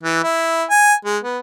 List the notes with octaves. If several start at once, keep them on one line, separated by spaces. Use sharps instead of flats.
E3
E4
G#5
G#3
B3